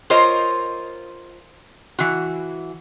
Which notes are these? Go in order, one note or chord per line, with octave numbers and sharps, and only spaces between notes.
F4 A#4 C5 C#5 D#5
E3 F#4